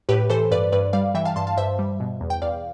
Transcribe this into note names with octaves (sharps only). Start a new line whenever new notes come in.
A2 G4 B4
E3 A4 C5
G2 B4 D5
G2 B4 D5
G3 D5 F5
E3 E5 G5
F5 A5
G2 A5 C6
F5 A5
G2 C5 E5
G3
B2
E2
G5
E2 D5 F5